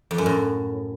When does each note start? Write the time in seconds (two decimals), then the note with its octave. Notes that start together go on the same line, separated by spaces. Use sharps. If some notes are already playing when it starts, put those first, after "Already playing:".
0.11 F2
0.18 F#2
0.26 A2